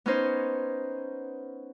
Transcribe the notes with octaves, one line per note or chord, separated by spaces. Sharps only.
B3 C#4 D#4 C5